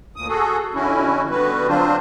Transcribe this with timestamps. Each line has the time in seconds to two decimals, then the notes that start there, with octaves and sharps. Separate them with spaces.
0.16 D2 A#2 D#6
0.28 F#4 G#4 A4
0.75 F2 D3 C#4 E4 F#4
1.30 D3 G3 B3 F#4 B4
1.68 F#3 C4 D4 F4 C5